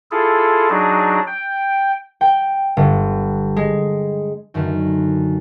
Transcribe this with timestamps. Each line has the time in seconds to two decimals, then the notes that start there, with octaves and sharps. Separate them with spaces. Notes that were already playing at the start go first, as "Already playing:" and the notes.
0.11 E4 F4 G#4 A4
0.69 F#3 D4 D#4 G#4
1.27 G5
2.21 G5
2.77 G1
3.56 G#3
4.54 F#2 D3 D#3